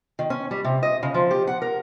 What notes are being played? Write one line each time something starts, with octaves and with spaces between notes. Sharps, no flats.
D#3
C#4
G3
C3
D#5
C#3
F3
G4
F#5
A#4